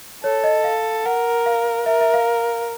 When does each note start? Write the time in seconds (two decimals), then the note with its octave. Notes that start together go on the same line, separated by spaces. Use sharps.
0.24 A4 C#5
0.44 D#5
0.64 F5
1.05 A#4 F#5
1.46 F5
1.86 A#4 E5
2.01 E5
2.14 F5